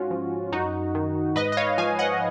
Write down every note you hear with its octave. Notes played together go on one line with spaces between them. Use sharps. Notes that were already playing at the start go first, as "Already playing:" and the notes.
Already playing: G#2 C#4 F4 F#4
F3
F#2 D#4 F#4
D#3
G#2 B4 D#5
D#5
C#5 F5
F3 F5 G#5
D#5 F#5